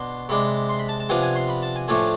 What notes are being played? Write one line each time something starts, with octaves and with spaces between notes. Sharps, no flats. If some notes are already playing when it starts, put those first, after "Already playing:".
Already playing: B2 B3 D4 C6
C3 G#3 D4 B5
C6
B5
A5
A5
C3 F3 B3 D4 G#5
G#5
C6
B5
A5
G#5
A2 F3 A3 D4 G#5